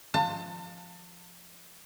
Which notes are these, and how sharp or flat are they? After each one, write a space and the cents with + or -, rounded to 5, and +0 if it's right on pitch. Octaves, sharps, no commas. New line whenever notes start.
F3 +0 A5 +35